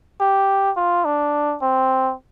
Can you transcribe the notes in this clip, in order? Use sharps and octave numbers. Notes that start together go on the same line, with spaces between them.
G4
F4
D4
C4